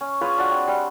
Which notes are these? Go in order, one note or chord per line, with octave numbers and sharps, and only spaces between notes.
C#4
F4 G#4 B4 C#5
C#4 D4 F#4
C4
G3